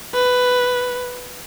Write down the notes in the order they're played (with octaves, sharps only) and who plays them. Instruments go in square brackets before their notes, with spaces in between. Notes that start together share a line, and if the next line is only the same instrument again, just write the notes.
[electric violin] B4